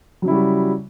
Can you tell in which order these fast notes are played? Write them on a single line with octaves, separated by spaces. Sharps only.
F#3 C#3 E4 G3 F#4